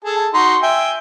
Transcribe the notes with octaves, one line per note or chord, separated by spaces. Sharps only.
G#4 A4 A5
D#4 F#4 C6
E5 G5 G#5